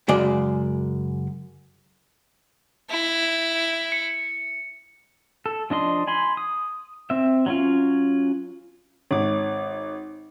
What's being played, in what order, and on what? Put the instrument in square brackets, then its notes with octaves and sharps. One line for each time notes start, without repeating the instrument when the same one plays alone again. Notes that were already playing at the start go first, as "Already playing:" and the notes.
[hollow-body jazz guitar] F#2 C#3 G#3 D5
[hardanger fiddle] E4
[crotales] C#7
[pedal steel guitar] A4
F3 D4 D#5 C6
G#5 B5 C6
D#6
C4 E5
F#3 C#4 F4
[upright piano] G#1 [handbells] C#5 D6